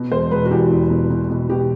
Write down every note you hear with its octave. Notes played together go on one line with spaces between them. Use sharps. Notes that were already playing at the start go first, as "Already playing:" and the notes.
Already playing: B2
E1 C5
E1 B4
F#4
E2 G4
E2
B2
B2
B2
B2 G4